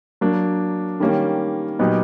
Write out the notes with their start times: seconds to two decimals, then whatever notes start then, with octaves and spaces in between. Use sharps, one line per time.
0.21 F#3 A#3 D4
1.00 D#3 G3 A#3 C#4
1.79 A#2 F#3 B3 D#4 G4